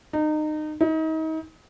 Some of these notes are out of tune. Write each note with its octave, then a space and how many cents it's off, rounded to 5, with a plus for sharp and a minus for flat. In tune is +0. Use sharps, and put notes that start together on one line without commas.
D#4 -25
D#4 +35